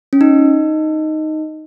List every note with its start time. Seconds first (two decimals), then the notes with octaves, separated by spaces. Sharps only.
0.13 C#4
0.21 D#4